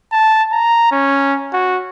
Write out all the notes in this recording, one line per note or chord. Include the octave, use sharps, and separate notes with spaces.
A5
A#5
C#4
F#4